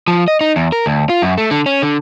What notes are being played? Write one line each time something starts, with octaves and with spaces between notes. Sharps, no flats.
F3
D#5
D#4
E2
A#4
D2
F4
F#2
A3
D3
C#4
D3